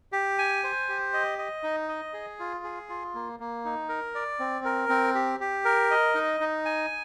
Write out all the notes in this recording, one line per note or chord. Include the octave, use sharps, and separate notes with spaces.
G4
G#5
C5
G4
D#5
D#5
D#4
D#5
G#4
F4
G#4
F4
A#3
A#3
D#4
A#4
D5
C4
A#4
C4
G4
G4
A#4
D#5
D#4
D#4
G#5